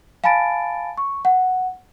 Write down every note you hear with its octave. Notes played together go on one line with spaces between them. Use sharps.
F5 G#5 A5 B5 A6 D7
C#6
F#5